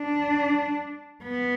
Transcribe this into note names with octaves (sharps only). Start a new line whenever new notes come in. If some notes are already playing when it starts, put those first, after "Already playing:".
Already playing: D4
B3